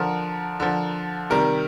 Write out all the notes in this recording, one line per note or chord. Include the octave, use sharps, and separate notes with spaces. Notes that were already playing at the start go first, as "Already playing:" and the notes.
Already playing: D3 F3 A#4
D3 F3
C3 D#3 G3 A#4